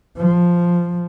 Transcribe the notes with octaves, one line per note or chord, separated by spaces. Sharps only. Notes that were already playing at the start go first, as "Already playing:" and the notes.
F3